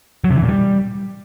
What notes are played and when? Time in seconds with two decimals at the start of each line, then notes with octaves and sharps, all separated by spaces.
0.24 F#3
0.30 C3
0.36 E3
0.42 A#2
0.49 G3